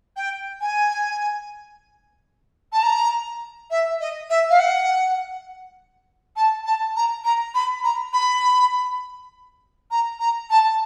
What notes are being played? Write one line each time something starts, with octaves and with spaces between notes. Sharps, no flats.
G5
G#5
A5
A#5
E5
D#5
E5
F5
F#5
A5
A5
A#5
A#5
B5
A#5
B5
A#5
A#5
A5